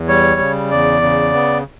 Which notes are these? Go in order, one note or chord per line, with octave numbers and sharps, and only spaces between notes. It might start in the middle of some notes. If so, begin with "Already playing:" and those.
Already playing: E2
G3 C#5
C#3
E2 D5
C#3
B3